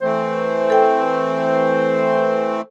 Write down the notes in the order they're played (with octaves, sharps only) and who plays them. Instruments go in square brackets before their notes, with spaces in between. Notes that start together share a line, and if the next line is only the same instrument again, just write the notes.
[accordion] E3 A3 C4 [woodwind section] C5
[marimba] A4 G5